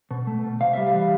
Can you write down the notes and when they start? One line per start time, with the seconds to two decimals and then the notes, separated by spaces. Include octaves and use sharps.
0.11 B2
0.27 A3
0.44 B2
0.60 C3 F5
0.73 G3 E5
0.87 F5
0.94 E3